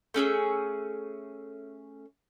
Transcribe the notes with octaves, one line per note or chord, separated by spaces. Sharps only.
A3 C#4 G#4 E6